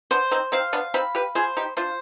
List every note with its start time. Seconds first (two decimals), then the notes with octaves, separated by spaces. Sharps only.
0.11 B3 D4 C5
0.31 C4 D#4
0.52 C4 D#4 F5
0.73 B3 D4
0.94 C4 D#4 B5
1.15 G4 B4
1.35 F4 G#4 C5
1.57 D#4 G4
1.77 D4 F4 C5